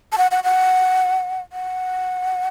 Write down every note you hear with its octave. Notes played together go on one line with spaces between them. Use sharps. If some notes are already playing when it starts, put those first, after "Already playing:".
A5
F#5
F#5
F#5
F#5